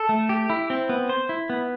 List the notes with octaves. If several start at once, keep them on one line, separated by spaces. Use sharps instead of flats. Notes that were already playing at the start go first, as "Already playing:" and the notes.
Already playing: A4
A3
G4
E4
C4
B3
C5
E4
B3